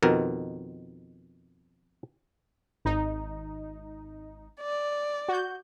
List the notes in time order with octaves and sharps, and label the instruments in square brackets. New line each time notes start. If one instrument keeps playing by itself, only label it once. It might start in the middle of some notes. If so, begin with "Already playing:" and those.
[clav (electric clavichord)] F2 B2 D#3 A#4
[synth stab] G#1 D#4
[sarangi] D5
[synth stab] F#4 G6